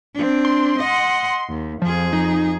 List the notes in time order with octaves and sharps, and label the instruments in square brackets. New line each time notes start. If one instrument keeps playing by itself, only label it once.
[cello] C4 D4
[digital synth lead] C6
[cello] D#5 F#5
D#2
[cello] F2 G#4 [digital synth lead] F3
[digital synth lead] D#4